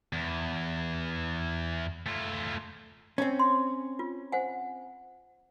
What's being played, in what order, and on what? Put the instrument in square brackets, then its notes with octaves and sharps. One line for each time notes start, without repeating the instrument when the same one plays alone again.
[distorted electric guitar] E2
A3 F4
[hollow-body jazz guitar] C4 C#4
[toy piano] C6
F4
C5 F#5 G#5